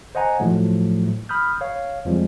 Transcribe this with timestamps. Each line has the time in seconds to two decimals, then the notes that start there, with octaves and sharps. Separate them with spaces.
0.15 C5 D#5 F#5 G#5 A#5
0.40 A2 F3 F#3 A3
1.29 B5 D#6 F6 G6
1.61 C#5 F5
2.05 F2 F3 G3 G#3